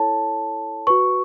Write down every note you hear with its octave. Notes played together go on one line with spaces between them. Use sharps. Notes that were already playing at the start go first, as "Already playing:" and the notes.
Already playing: E4 A4 C#5 A5
F#4 B4 C#6